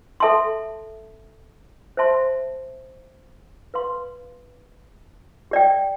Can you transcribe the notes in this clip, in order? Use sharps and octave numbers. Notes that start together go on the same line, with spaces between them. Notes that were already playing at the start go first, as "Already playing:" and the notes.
A4 E5 A5 C6
C5 E5 A5 C6
B4 F5 C6
G4 D5 G5